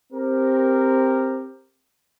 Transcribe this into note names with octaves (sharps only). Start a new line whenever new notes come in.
C4 G4 A#4